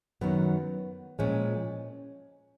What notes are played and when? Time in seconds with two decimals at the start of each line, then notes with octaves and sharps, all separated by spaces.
0.21 F#2 D#3 F#3 B3
1.19 A#2 F3 G#3 C#4